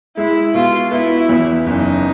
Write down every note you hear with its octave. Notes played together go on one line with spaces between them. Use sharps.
G#3 E4
B2 F4
B3 E4
E2
F#1 D#4